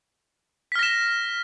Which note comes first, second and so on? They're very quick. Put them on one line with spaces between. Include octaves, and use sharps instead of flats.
B6 F6 A#6 E7